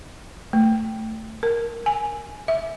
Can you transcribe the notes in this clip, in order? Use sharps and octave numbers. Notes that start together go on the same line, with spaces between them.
A3
A#4
G#5
E5